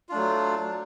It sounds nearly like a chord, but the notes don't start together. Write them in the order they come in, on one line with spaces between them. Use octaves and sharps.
F4 D4 A3 F#3